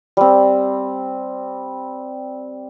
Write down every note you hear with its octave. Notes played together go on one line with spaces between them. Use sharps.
G3 C4